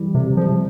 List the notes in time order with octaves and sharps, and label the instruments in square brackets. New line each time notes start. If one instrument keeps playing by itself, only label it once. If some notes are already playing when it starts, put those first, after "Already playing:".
Already playing: [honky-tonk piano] E3 G3
[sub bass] C3 [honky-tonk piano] C4
[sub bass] F3 [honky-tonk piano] G3